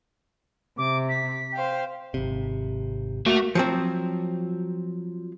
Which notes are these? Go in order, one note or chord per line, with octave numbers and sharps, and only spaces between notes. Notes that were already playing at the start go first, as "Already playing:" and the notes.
C3 D6
B6
C5 F5 G5
G#1 C3
A3 A#3 F#4 E5 F7
F3 F#3 C4